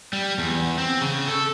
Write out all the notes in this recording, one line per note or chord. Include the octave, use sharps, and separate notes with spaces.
G3
E2
C4
C#3
A4